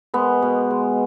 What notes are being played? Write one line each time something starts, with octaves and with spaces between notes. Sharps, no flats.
G#3 B3
B2
G#3